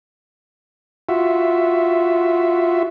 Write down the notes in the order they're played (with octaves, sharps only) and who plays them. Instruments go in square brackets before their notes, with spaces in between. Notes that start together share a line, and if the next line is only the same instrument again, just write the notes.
[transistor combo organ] F4 F#4 E5